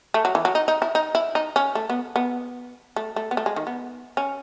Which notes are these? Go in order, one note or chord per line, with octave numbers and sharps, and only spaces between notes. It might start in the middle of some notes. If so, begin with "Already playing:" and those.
A3
F#3
E3
F#3
D#4
D#4
E4
D#4
E4
D#4
C#4
A3
B3
B3
A3
A3
B3
A3
G#3
D#3
B3
C#4